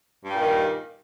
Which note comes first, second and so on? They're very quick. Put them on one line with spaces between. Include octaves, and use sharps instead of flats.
G2 G3 A#2 D#3